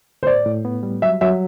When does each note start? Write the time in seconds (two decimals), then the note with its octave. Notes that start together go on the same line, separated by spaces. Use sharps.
0.23 C5
0.27 A2 D5
0.46 A2
0.65 B3
0.83 G3
1.02 F#3 E5
1.21 F#3 E5